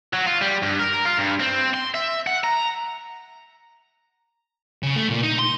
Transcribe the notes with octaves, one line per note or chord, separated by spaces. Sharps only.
F#3
F4
G3
G2
A#4
F4
G2
C4
C6
E5
F#5
A#5
C#3
A3
A#2
D#4
C6